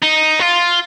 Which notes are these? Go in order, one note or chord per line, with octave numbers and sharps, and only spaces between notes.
D#4
F4